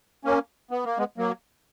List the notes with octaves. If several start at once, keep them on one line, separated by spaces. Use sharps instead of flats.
A#3 C#4
B3
A#3
G#3 B3
F#3 A#3